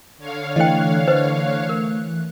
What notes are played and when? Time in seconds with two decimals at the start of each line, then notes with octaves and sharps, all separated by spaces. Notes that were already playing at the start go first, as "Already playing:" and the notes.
0.18 D3 C#5 F5
0.56 E3 A3 D#5 G5 F#6
1.08 B4 C5 D#5
1.69 A#4